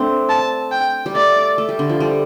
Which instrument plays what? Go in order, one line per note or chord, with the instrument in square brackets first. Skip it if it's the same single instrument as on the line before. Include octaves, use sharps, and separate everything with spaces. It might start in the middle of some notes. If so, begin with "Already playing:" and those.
Already playing: [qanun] A3 C4 D4
[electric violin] A5
G5
[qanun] G3
[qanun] A3 [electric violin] D5
[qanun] A3
G3
D3
F3
G3